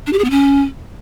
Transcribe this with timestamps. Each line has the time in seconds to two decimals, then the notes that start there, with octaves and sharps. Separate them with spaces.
0.07 D4
0.13 G4
0.18 G#4
0.24 B3
0.30 C#4